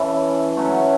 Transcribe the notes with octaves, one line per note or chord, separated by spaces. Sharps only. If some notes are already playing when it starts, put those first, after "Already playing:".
Already playing: E3 C#4 A4
F#3 A3 C#4